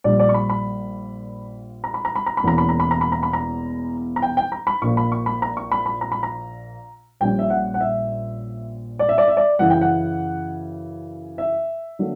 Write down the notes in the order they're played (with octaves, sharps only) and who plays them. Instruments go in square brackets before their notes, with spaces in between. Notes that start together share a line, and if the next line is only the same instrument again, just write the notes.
[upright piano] A#1 A#2 G3 D5
D5
C#6
B5
B5
A#5
B5
A#5
B5
A#5
B5
E1 E2 B2 A#3 C#4 A#5
B5
A#5
B5
A#5
B5
A#5
B5
A#5
A#5
G5
G5
A#5
B5
A#1 A#2 A#3 C#6
B5
C#6
B5
A#5
C#6
B5
B5
A#5
B5
A#5
A#1 A#2 G3 C#4 G5
E5
F#5
F#5
E5
D5
E5
D5
E5
D5
F#2 C#3 E3 F#5
G5
F#5
E5
D3 F#3 A#3